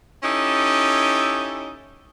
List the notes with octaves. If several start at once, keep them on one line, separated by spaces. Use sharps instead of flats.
C#4 D#4 E4 G4 A4